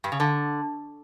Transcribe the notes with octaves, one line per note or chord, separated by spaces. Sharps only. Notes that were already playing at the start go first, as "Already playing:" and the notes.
G2
C#3
D3